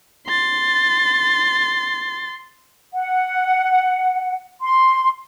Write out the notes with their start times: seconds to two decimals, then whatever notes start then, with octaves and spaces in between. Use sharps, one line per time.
0.27 C6 A6
2.94 F#5
4.61 C6